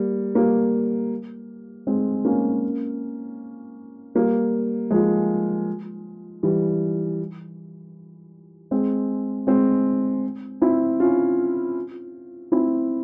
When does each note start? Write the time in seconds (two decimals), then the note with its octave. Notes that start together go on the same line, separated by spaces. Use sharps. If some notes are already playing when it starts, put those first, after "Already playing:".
Already playing: G3 A#3
0.35 G3 A#3
1.87 G#3 C4
2.25 A#3 C#4
4.15 G3 A#3
4.91 F3 G#3
6.43 E3 G3
8.71 G#3 C4
9.47 G#3 C4
10.62 C4 E4
11.00 C#4 F4
12.52 C4 E4